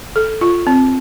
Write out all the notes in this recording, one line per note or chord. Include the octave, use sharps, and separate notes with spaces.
A4
F4
C4